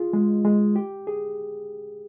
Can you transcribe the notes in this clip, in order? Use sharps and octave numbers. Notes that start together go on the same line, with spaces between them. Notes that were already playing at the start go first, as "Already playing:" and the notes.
Already playing: F4 G#4
G#3
G#3
G4
G#4